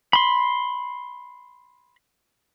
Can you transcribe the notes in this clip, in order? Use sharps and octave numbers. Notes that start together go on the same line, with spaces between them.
B5 C6